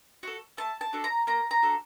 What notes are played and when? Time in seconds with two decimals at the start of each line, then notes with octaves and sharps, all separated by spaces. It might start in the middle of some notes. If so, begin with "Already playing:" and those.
0.23 F#4 A4
0.57 A3 A5
0.81 A5
0.93 D4 F#4 A4
1.04 A#5
1.27 A#3 A#5
1.51 A#5
1.62 D4 F#4 A4